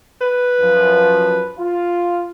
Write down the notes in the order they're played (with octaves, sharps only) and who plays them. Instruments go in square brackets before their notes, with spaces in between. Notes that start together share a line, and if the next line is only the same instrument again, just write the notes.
[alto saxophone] B4
[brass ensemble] F#2 F3
F4